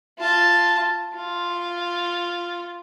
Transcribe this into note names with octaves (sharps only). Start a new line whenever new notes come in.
F4 A5
F4